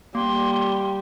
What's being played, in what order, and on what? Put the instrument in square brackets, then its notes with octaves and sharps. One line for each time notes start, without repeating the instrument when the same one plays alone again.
[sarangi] G3 [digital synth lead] A#3 [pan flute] C6